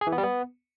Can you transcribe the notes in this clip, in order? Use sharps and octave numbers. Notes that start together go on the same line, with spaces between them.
G#4
E3
B3
G3
B3